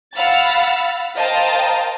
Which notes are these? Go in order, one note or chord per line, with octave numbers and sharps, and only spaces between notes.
F5 F#5 B5 E6 F6 A6
A#4 C5 D#5 F5 G5 A5